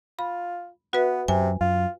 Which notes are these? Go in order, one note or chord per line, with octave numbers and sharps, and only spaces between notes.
F4 B5
B3 F#4 B4 E5
F#2 C3 G#5
F#2 F4